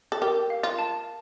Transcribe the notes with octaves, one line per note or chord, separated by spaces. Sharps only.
A4
G4 A#4
F5
F4
A5